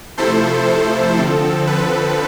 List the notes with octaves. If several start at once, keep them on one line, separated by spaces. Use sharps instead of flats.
C3 F3 A3 E4 A4 C5
A4
D3 F3 C4
B4